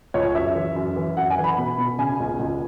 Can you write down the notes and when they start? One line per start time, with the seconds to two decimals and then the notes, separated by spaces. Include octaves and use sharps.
0.14 C#2 C#5
0.35 F#2 E5
0.55 E3
0.76 F#2
0.96 E3
1.17 F#2 F#5
1.30 G#5
1.38 E3
1.44 B5
1.58 B2
1.78 B2
1.98 C#3 G#5
2.20 C#2
2.39 C#2